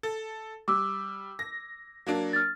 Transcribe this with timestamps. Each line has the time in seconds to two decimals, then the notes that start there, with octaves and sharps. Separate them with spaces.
0.03 A4
0.68 G3 D6 E6
1.39 A#6
2.06 F#3 A#3 D4
2.33 F6 A6